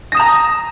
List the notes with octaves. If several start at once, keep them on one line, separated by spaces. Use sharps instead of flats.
A#5 D#6 A#6 E7